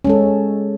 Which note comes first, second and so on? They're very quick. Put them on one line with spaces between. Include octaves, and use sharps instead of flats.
C#4 G#3 A4